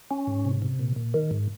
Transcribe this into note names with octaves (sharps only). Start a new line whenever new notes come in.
C#4
G#2
C3
C3
A#2
A#2
D#3
G#2